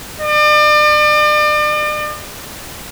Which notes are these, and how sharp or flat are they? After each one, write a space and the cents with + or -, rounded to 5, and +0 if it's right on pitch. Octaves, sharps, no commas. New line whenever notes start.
D5 +40